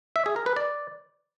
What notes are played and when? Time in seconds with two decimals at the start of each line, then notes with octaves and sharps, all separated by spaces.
0.16 E5
0.26 G#4
0.36 A#4
0.46 B4
0.56 D5